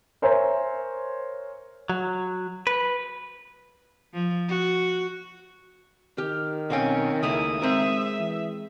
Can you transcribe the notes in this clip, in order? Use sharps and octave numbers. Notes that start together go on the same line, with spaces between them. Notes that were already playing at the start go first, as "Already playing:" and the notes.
A#4 C5 C#5 E5 G#5 A#5
F#3
B4
F3
F#4
D#3 G4 F6
B1 C4 C#4 F5 G5
C#2 A3 A#3 E4 D#6
G#3 C4 A#4 E5
E3